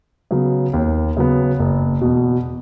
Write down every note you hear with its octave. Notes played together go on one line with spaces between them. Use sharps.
C#3 F#3 B3
D#2
C#3 F#3 B3
F#1
E2 B2